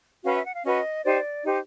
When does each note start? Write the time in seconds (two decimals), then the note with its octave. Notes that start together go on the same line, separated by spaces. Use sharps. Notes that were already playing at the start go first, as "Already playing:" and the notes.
0.24 C#4 F#4 B4 F5
0.35 E5
0.44 F#5
0.54 F5
0.64 C#4 F#4 B4 D#5
1.04 D#4 G4 C5 D5
1.44 D#4 G4 C5